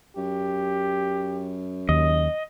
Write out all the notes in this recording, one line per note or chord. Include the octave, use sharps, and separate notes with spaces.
F#2 G4
D#2 D#5